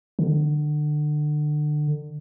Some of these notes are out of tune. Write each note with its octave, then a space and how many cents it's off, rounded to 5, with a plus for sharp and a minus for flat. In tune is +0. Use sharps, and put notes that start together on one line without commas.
D3 +30